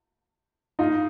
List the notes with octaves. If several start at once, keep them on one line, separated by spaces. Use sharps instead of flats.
D#4 F4